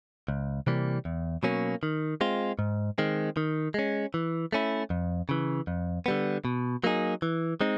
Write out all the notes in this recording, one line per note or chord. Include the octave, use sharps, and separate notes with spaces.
C#2
C3 E3 G3 A#3
E2
B2 F#3 A#3 C#4
D#3
G#3 C4 F4
G#2
D#3 G#3 C4
D#3
G#3 C#4
E3
A3 C#4 E4
F2
C#3 E3
F2
D3 G3 B3
B2
F#3 A#3 D#4 G#4
E3
G#3 C4 D#4